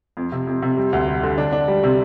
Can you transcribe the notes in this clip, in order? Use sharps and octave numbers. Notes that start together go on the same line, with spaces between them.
F2
C3
F2
C3
G3
D2
G3
D3
D4
D4
G3
C3